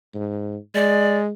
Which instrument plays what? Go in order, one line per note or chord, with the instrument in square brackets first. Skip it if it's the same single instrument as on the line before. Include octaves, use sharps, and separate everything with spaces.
[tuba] G#2
[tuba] G#3 [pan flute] D5